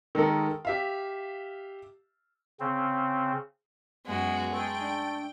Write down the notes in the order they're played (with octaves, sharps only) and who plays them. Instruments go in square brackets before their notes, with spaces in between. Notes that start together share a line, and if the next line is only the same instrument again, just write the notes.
[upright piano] D#3 G#3 A4 A#4
G4 E5 F5
[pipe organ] C#3 C4
[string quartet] F#2 F#4 [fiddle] G#3 [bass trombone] B3
[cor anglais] A3 [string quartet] G5
[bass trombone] D4